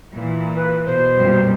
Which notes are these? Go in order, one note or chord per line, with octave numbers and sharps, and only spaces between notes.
A#2 E3
B4
B2 C5
F#2 A#2 G3